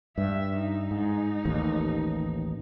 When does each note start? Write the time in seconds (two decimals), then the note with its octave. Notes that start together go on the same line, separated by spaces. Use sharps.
0.18 G2 E5
0.59 D#4
0.91 G#2
1.45 A1 D#2